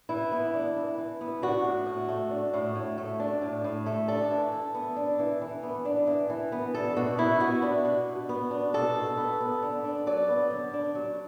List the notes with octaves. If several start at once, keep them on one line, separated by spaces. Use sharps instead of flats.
E3 E4
B3
D4
E3
E3
B3
D4 F#4
A2
A2
A3
D4
A2
A2
A3
D4
A2
A2
A3
D4 A4
E3
E3
B3
D4
E3
E3
B3
D4
E3
E3
B3
D4 A4
B2 F#4
B2 E4
B3 F#4
D4
B2
B2
B3
D4
B2 A4
B2
B3
B3
D3
D4
F#3 D5
B3
D3
D4
F#3